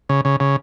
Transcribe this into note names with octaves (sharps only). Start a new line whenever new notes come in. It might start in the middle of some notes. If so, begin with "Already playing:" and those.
C#3
C#3
C#3